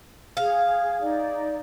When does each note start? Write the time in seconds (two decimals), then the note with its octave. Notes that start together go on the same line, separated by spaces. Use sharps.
0.37 G#4 F5
1.02 D#4 D5